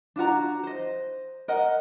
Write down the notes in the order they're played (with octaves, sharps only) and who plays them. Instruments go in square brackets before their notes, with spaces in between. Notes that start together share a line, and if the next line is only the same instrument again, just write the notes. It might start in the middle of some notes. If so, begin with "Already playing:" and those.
[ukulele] D4 F4 F#4 A#5
C5 D#5
A#4 D#5 F#5